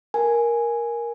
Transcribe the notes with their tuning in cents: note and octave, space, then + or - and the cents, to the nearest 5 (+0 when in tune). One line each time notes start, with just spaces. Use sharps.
A#4 +10 G#5 +0